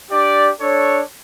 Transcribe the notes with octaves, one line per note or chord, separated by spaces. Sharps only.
D4 G4 D5
D4 A4 C#5